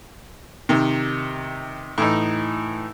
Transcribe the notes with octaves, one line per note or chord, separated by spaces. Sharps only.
C3 D#3
A2 E3 D#4